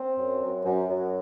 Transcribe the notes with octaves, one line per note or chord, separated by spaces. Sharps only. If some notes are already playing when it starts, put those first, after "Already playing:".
Already playing: C4
F#2
F#2
F#2
F#2